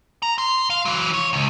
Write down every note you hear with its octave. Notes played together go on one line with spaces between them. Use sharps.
A#5
C6
F5
E3 F#3
C#5
C#2